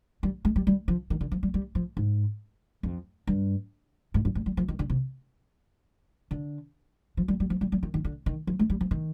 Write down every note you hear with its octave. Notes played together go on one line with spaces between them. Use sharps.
G3
G#3
G3
G3
F3
D#3
D3
F3
G3
G3
F3
G#2
F2
G2
G#2
G2
G#2
G3
F3
D#3
D3
C3
D3
F3
G3
G3
F3
G3
G3
D#3
D#3
D3
D#3
F3
G#3
G3
F3
D#3